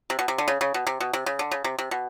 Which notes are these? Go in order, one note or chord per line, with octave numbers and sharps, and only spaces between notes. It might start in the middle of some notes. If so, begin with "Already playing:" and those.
C3
B2
C3
D3
C#3
C#3
B2
C3
B2
C3
C#3
D3
C#3
C3
C3
B2